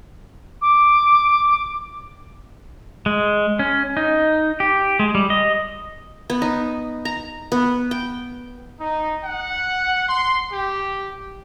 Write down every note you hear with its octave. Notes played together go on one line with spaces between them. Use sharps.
D6
G#3
C#4
D#4
G4
G#3
G3
D#5
B3
D#4
A#5
B3
G5
D#4
F#5
C6
G4